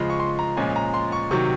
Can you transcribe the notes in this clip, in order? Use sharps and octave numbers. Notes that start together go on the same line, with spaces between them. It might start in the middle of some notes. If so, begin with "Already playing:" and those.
Already playing: C#3 F3 G#3
C#6
C6
A#5
A#2 F3 G#3 C#4 G#5
A#5
C6
C#6
C3 D#3 F#3 C#6